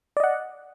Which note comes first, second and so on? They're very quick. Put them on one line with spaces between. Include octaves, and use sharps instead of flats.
D5 D#5 F#5